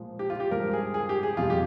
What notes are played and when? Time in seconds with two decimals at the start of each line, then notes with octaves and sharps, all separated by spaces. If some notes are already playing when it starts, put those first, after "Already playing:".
Already playing: A#2 F3 G#3
0.19 G4
0.30 F4
0.40 G4
0.51 G2 F3 G#3 A#4
0.73 G#4
0.94 G#4
1.09 G4
1.23 G#4
1.37 F2 C3 G3 F4
1.50 G4